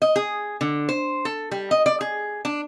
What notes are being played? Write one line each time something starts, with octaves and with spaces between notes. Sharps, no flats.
D#5
G#4
D3
C5
A4
G3
D#5
D5
G#4
D4